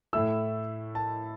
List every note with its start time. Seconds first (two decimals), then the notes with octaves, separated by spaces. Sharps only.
0.13 A2 A3 E4 E6
0.95 A5